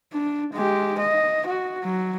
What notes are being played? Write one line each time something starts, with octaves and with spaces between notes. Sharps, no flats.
D4
G#3 G4
D#5
F#4
F#3